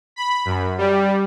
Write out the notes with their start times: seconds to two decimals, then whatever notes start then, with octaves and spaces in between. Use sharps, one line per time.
0.16 B5
0.45 F#2
0.78 G3